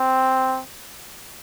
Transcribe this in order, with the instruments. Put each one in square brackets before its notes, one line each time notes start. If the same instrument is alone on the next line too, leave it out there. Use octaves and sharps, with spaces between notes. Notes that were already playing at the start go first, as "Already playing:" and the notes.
Already playing: [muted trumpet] C4